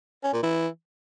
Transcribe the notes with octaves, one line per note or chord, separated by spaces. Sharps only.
C#4
A#2
E3